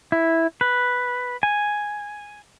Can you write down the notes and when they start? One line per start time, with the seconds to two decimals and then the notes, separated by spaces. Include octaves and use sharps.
0.12 E4
0.61 B4
1.43 G#5